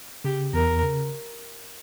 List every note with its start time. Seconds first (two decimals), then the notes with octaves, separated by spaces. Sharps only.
0.25 C#3 G4
0.53 E2 A#4
0.83 C#3